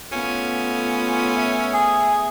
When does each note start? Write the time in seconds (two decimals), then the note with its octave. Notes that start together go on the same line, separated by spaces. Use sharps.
0.12 A3 B3 C#4 F4
1.36 E5
1.73 G#4